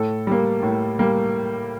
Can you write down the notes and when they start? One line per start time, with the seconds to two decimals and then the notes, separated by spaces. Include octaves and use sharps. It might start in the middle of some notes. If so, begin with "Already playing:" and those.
Already playing: A2 A4
0.27 G3 A#3
0.63 A2
0.99 G3 A#3